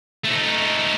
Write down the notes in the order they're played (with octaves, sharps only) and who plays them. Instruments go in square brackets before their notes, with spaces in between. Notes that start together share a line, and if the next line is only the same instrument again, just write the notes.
[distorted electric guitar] A3 D#4